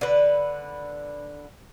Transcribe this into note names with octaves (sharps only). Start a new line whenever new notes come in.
D3 B4